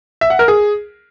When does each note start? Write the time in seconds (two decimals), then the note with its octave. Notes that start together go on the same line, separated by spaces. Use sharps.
0.21 E5
0.30 F#5
0.39 A#4
0.48 G#4